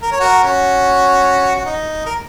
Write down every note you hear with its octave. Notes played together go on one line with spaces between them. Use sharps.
A#4
C#5
F#4 A#4
C#4 F#4
F#4
D#4
A#4